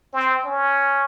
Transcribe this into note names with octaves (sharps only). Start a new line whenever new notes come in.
C4
C#4